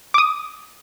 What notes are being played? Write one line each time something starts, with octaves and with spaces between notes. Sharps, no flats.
D6 D#6